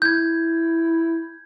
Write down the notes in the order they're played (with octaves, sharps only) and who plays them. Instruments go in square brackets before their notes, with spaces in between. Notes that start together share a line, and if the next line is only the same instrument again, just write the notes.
[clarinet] E4 [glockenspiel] G6 G#6